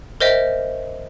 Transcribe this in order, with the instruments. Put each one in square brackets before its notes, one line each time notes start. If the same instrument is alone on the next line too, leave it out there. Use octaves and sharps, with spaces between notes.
[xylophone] A#4 C5 D#5 E5 G5